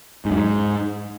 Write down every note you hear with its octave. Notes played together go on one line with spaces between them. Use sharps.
G#2
F#2
G#2